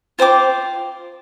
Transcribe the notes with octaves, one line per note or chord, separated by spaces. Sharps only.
F4 C5 G5 D6